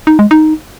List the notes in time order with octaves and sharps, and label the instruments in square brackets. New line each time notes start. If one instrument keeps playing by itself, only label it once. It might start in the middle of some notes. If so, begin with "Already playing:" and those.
[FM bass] D#4
G#3
D#4